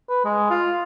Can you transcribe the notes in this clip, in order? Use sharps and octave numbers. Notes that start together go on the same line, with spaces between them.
B4
G#3
F4